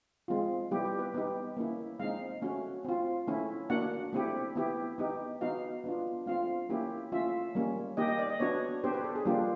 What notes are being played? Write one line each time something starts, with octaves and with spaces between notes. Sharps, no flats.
G#3 C4 F4
G3 B3 E4 G4
G4
B4
B3 D#4 G4
A#3 C#4 E4
G#3 C4 D#4 F5
A3 C#4 F#4
C4 F4
A3 C#4 E4
A#3 D4 F#4 F#5
A3 C4 E4 G4
B3 E4 G4
B3 D#4 G4
B3 D#4 F#4 F5
B3 D4 F4
A3 C4 F4 F5
A#3 C#4 E4 G4
A3 C#4 F4 E5
G3 A#3 C#4
A#3 D#4 G4 D#5
D#5
D5
D#5
B3 D4 F#4 C#5
B3 D4 G4 C5
B4
A4
G#4
G3 A#3 D4 F4 G4